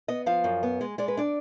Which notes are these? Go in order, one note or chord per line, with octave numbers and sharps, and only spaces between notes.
B3 D#5
F3 F5
F#2
B3
G#3
G#3 D5
B4
D4 D5